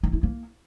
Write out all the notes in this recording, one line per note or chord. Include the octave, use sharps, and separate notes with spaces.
D#4
E4
A#3